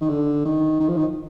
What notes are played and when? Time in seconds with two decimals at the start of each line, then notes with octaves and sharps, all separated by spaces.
0.01 D#3
0.09 D3
0.45 D#3
0.80 D#3
0.88 F3
0.97 D#3